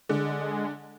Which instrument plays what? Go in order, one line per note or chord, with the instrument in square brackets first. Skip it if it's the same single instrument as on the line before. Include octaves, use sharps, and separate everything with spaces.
[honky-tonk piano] D3 [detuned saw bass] G#3